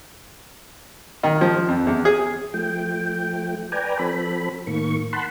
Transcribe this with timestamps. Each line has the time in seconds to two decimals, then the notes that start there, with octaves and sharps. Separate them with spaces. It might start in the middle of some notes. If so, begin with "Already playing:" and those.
1.23 D#3
1.41 F3
1.68 F2
1.87 E2
2.05 G#4
2.54 F3 A3 G5
3.72 B4 D5 G5 G#5 A#5
3.99 F3 C4 A4 B5
4.67 A2 D#3 A#3 C#6
5.13 F#5 A5 B5 C6